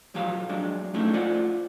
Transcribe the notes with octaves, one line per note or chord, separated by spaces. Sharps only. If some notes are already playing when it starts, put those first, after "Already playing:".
B1 F3 F#3 G4 F5 B5
F#3 G#3 D4
F#2 C#3 F3 A3 D#4 E4
F4 C5 D5 F#5